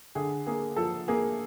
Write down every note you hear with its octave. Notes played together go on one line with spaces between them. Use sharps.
D3 G#4
A#3 G#4
F3 A4
A#3 G#4